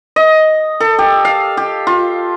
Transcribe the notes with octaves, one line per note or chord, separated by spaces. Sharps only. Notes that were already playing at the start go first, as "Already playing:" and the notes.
D#5
A4
G4
F5
G4
F4